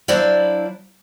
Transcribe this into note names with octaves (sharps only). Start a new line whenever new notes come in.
F#3 D4 E4 C5 D5 F5